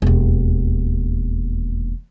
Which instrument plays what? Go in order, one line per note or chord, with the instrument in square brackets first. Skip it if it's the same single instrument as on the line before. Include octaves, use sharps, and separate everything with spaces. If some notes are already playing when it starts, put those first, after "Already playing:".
[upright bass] E1 D#2